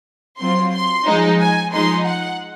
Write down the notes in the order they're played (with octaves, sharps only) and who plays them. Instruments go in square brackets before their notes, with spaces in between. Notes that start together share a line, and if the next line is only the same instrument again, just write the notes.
[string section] F#3 C4 F4 C6
C6
F3 G#3 D#4
G#5
F3 G#3 D#4 C6
F#5